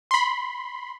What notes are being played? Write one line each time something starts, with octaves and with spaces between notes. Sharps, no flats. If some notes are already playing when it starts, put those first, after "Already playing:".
B5 C6